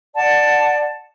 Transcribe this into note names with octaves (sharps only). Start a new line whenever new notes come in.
D5 F#5 A5